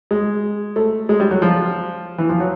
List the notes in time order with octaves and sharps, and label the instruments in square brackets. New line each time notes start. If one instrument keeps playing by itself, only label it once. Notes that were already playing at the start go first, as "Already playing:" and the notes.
[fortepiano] G#3
A3
G#3
G3
F#3
F3
E3
F3
F#3